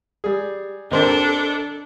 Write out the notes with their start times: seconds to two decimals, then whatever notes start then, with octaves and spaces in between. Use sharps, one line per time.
0.24 G3 G#4
0.91 D#2 C4 D4 A4 A#4